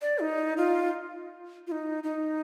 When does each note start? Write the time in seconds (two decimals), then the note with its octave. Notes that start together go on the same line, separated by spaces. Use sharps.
0.02 D5
0.21 D#4
0.57 F4
1.67 F4
1.72 D#4
2.03 D#4